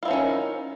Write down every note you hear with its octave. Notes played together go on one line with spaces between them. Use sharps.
D#3 F3 C#4 E4 F4